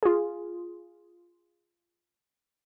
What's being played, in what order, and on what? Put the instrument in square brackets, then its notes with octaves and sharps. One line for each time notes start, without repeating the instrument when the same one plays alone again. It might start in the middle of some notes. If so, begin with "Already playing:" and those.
[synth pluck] F4 G#4